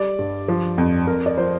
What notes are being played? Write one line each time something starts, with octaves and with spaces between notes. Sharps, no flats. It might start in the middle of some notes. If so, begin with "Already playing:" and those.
Already playing: G3 D5
G2
F3
F2
F2 A#4
D5
F3 C5